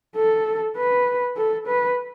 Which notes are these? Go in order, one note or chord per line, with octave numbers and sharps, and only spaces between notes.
A4
B4
A4
B4